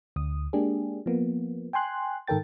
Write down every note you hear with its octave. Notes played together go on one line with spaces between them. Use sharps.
D2 D#6
G#3 A#3 D4 G4 G#4
F3 A#3 B3
G5 G#5 C6 F#6
G#2 D#3 A4 A#4 G5 A6